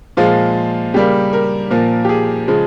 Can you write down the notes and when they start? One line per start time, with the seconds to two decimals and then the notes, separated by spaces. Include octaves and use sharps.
0.17 A#2 F3 G#3 F4
0.94 C#3 G3 A#3 G4
1.33 A#4
1.71 A#2 F3 A#3
2.05 G4
2.09 G#4
2.48 C#3 F3 G#3